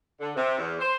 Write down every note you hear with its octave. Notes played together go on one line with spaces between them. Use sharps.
D3
C3
E2
C5